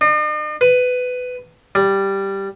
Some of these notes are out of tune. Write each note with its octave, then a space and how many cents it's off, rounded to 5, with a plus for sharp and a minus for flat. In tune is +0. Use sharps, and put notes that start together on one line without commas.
D#4 -45
B4 +15
G3 +0